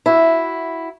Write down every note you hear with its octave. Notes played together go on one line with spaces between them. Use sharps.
E4 F#4